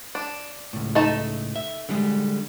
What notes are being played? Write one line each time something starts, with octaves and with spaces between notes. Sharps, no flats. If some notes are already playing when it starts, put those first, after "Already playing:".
D4
C#2 A2
A3 D#4 A5
E5
D3 G3 G#3